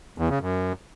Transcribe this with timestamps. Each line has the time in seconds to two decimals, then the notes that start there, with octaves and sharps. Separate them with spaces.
0.18 E2
0.29 C#3
0.41 F#2